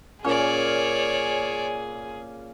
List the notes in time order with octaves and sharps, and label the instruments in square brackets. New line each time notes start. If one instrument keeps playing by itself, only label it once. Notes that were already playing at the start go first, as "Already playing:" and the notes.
[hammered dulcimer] A#2 C#4 [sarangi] G#4 [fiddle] C#5 D5